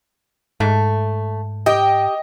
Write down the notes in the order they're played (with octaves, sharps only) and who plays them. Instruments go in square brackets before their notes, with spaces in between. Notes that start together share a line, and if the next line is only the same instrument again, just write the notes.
[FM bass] G#2 [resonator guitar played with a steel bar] A3
[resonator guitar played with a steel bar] G4 [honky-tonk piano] D#5 [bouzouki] G5